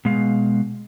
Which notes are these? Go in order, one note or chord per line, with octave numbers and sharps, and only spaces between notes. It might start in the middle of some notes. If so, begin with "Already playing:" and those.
B2 G#3 F5